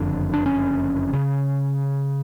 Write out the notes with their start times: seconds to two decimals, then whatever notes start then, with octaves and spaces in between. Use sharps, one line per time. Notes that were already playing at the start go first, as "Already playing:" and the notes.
Already playing: F#1 F2 D3
0.34 D4
0.46 C#4
1.13 C#3